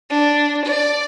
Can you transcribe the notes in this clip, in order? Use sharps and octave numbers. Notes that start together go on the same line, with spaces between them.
D4
D5